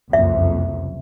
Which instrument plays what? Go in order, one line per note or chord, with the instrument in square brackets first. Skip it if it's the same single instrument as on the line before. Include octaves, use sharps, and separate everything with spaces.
[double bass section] F#1 C2 F2 [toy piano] E5